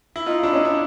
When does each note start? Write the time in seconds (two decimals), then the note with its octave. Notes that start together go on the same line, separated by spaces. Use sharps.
0.16 E4
0.26 D#4 F4
0.43 D4 E4
0.53 C#4 D#4
0.65 D4 E4